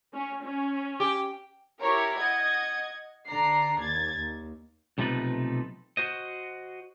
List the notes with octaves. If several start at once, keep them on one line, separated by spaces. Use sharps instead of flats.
C#4
C#4
G4
E4 G4 A#4 C#5
D#5 F#5 G#6
D3 D4 A#5 C7
D#2 G#6 A6
D#2
B1 C3 F3 A3 D#4 B4
F#4 C5 D#5